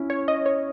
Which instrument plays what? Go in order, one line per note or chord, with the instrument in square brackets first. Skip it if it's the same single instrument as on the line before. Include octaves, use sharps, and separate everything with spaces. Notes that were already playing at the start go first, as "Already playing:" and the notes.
Already playing: [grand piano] C#4 E4
[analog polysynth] C#5
D#5
C#5